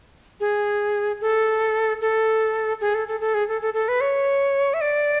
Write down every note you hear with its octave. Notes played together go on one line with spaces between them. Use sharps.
G#4
A4
A4
G#4
A4
A4
A4
G#4
A4
A4
A4
B4
C#5
E5
D5